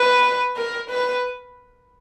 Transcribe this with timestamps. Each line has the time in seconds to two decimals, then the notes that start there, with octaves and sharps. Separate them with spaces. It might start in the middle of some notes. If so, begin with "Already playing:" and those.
Already playing: B4
0.56 A#4
0.90 B4